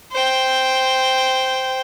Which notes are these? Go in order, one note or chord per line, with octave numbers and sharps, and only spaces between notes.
C5 G5